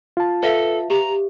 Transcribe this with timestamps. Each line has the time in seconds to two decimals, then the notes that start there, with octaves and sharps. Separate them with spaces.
0.17 F4 A5
0.43 A4 B4 E5 F5
0.90 G4 A#5